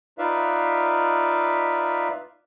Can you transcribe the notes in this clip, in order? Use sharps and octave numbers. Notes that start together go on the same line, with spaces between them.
D#4 F4 B4 D5 E5 F5